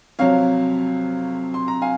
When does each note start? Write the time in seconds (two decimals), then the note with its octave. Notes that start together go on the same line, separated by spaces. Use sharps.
0.19 F2 C3 F#3 C#5 F5
1.54 C6
1.68 A#5
1.82 F5 G#5